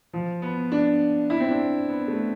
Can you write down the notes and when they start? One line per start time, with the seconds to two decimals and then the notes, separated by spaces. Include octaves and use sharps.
0.13 F3
0.42 B3
0.72 D4
1.30 E4
1.40 C4
1.49 D4
1.89 B3
2.08 A3